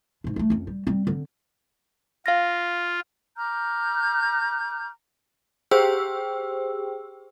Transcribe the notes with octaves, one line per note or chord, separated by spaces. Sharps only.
G#2 G#3
G#3 A3
F2 C#4
G3
G3 C4
D3 C4
F4 F5 A#6
A#5 D6 F6 G6
G4 G#4 C5 G5 E6